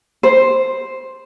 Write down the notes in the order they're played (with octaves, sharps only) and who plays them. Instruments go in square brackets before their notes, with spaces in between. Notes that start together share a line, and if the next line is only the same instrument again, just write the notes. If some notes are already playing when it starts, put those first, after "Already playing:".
[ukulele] C5